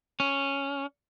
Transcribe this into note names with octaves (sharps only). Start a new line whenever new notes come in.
C#4